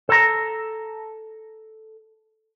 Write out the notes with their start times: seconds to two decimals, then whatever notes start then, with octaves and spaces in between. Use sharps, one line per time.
0.09 A4 A#5